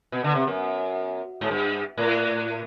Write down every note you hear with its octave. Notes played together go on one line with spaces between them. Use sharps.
B2
D3
C3
F#2
G#2
G2
A2